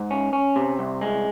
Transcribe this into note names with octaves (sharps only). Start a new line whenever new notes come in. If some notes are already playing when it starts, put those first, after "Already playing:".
Already playing: G#2
C#4
C#4
C3
C2
G#3